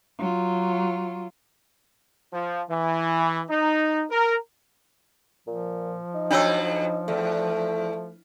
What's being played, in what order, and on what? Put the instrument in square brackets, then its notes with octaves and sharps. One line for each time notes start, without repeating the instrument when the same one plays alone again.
[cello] F#3 F4
[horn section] F3
E3
D#4
A#4
[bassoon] A#2 [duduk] F3
[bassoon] D#4
[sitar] F2 F#3 [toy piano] D4 C#5 E6
[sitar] E2 [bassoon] A3